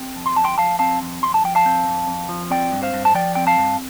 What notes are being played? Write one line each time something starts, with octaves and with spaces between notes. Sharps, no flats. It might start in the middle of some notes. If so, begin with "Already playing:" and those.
Already playing: C4
F2
C6
F2 A5
G5 C6
F3 F5 A5
C4 F5 A5
F2
F2 C6
A5
F3 G5
F5 A5
C4
F2
F2
F3
C4 D5 G5
G2
C5 F5
G2
A5
F3 D5 G5
C4 G5
F5 A5
G2